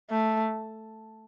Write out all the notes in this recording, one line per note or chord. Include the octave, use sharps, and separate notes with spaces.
A3